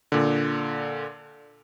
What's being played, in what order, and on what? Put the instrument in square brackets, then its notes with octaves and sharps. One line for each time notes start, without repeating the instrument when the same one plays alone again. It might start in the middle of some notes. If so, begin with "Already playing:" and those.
[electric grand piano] A#2 D3